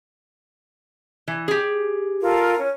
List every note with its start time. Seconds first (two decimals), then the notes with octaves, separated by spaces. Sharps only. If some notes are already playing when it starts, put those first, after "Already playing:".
1.28 E3
1.48 G4 G#4
2.21 F4 A4 A#4
2.57 C#4